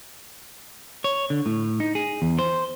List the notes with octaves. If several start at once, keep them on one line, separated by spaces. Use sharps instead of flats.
C#5
D3
A2
D#4
G#4
E2
C5